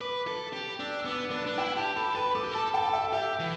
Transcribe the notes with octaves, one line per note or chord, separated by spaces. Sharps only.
B4 D6
A4
G4
D4 E6
E6
B3 D6
D4 B4
D4
E4 G5
G4 A5
A4 B5
B4 B5
A4 D6
G4
A4 A5
A4 G5
E5
G4 E5
E3